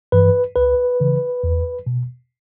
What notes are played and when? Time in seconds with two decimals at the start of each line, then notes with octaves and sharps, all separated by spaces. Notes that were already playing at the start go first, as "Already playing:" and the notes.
0.12 G2 E3 B4
0.56 C#2 B4
1.00 C#3 E3
1.44 E2
1.87 B2